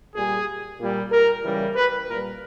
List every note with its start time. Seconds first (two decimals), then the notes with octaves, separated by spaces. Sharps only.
0.15 A#2 G3 G#4
0.80 A#2 G3
1.11 A#4
1.44 C#3 E3 G3
1.76 B4
2.08 A#2 G3 A#4